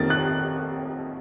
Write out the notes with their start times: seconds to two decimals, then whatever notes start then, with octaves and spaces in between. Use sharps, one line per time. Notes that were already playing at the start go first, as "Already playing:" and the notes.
Already playing: F2 D#3 A#3 A6
0.10 F#6